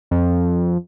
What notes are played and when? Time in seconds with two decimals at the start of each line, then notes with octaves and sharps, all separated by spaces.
0.11 F2